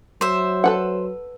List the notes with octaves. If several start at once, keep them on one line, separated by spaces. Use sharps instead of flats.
F#3 C5 E5
A4 B4 F#5